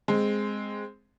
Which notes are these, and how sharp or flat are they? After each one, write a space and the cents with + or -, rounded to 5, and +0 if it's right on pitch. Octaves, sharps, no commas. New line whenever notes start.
G#3 +0 C4 +0